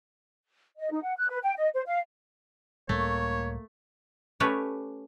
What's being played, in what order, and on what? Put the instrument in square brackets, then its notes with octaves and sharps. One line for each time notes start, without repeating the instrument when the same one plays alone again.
[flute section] D#5
D#4
F#5
F#6
B4
G5
D#5
C5
F5
[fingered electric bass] C#2 A2 G3 [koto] A3 [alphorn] A#3 [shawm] C#5
[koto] A3 C#4 G4 B4 C#5 D5